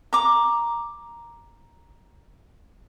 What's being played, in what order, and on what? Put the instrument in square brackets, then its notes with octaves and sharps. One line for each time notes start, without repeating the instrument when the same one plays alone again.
[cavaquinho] A#5 D6